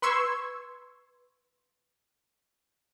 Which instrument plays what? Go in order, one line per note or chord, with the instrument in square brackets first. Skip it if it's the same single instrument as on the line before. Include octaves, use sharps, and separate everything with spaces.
[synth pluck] B4 C6 C#6 E6 G#6